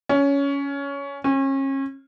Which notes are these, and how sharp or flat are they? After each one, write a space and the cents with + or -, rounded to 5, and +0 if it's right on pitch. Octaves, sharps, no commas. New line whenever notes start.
C#4 +15
C#4 -35